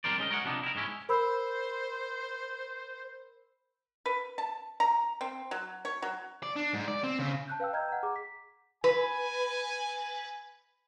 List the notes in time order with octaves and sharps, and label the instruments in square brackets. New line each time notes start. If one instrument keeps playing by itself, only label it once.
[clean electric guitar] G3 C4 A#4 C5 D5
G#3 C#4 D#4 A#4
A#4 C#5 D5 F#5
C3 F3 B3 D4 D#4
E4 A#4
G#2 G#3 C#4 E4
[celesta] A#4 B5 E6 [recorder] C5
[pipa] B4
A5
A#5
C4
F#3
C#5
F#3
[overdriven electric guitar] D5
D4
G#2
D5
C4
C#3
[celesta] A5 F#6 G6
B4 F5 G5 E6
D#5 G5 A#5 F6 G6 G#6
F#5 A#5
G#4 A#5 D6
B6
[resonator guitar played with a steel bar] B4 [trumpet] G#5